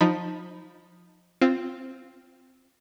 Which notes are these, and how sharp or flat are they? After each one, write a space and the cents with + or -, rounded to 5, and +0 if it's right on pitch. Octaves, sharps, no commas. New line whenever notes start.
F3 +20 D#4 +5 B5 +0
C4 +0 F4 +0